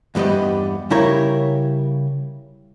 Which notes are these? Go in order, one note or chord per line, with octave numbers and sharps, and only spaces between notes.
E2 G2 G3 B3 D#5
C#3 G3 E4 A#4 C#5